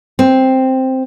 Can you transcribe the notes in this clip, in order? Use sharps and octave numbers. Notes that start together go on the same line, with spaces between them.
C4